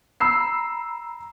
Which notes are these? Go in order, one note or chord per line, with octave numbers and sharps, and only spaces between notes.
A#5 B5 E6 C7